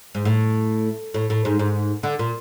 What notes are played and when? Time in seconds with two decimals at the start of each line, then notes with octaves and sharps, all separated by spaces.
0.15 G#2
0.25 A2
1.14 A2
1.30 A2
1.45 G#2
1.59 G#2
2.03 D3
2.19 A#2